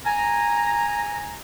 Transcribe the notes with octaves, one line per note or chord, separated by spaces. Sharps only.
G#5 A#5